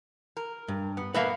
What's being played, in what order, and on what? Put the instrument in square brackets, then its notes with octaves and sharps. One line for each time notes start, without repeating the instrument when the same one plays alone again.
[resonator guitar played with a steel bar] A#4
[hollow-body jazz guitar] G2
[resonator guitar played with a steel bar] B3
[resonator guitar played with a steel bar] A#3 B3 [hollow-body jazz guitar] B4 E5 F5